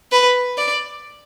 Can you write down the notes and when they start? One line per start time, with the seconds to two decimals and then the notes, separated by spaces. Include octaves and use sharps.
0.12 B4
0.57 D5